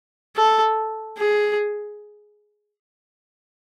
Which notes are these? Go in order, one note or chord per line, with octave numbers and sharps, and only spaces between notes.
A4
G#4